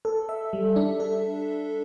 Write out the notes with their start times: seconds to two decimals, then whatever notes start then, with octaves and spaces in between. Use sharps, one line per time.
0.05 A4
0.29 E5
0.53 G3
0.76 D4
1.00 A4